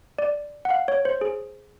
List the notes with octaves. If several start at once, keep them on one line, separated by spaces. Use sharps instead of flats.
D5
F#5
F5
C#5
C5
G#4